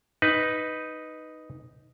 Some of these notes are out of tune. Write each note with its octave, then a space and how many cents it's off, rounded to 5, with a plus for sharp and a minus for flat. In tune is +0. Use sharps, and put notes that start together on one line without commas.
D#4 +0 B4 +0